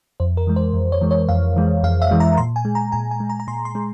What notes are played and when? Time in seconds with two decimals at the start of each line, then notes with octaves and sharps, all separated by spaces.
0.20 F2 C5
0.37 A#4
0.47 E3 G#3
0.56 C5
0.74 F2
0.92 C#5
1.02 E3 G#3
1.11 C#5
1.29 F2 F5
1.56 E3 G#3
1.83 F2 F5
2.02 E5
2.11 E3 G#3
2.20 A#5
2.38 A#2 C6
2.56 G#5
2.65 G#3
2.75 A#5
2.92 A#2 G#5
3.11 G#5
3.20 G#3
3.30 A#5
3.40 A#5
3.48 A#2 C6
3.65 C6
3.75 G#3